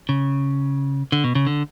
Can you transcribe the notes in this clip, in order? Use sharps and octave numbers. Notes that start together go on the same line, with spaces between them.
C#3
D3
B2
C#3
D3